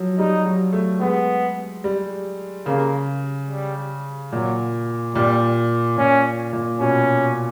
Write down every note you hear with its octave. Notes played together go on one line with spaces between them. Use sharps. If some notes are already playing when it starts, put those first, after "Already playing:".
Already playing: F3 F#3
G3 D#4
F#3
A3
G#3 B3
G3
C#3 A#3
G3
A#2 F#3
A#2 G3
A#2 C#4
A#2
B2 C#4